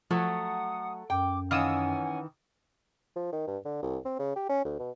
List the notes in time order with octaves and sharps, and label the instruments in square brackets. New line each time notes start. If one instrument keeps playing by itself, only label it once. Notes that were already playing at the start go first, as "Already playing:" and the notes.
[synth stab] F3 [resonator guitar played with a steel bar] F#3 A3 [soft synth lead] F#5 [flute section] D#6
[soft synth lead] F#2 [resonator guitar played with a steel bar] G5 [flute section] D6
[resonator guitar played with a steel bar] D#3 E3 [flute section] C#4 F#5 G#5 [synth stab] F5 D#6 E6
[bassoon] F3
D#3
G2
D3
C2
C4
C#3
G4
C#4
D2
B2